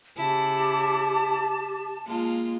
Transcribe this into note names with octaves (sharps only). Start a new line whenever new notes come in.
C#3 E4 G4 A5
G#3 A#3 F4